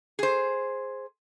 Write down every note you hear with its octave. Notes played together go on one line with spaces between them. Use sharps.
G#4 C5